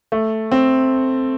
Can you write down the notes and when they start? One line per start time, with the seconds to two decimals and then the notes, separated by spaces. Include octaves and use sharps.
0.12 A3
0.51 C4